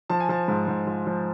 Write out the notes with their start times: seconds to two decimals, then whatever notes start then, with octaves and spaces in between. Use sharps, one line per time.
0.10 F3 A5
0.20 G#5
0.29 F3 A5
0.48 G#2
0.68 G#2
0.87 F3
1.07 F3